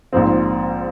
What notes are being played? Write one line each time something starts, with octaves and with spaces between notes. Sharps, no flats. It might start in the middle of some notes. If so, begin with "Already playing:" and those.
A#1 G#2 F3 C4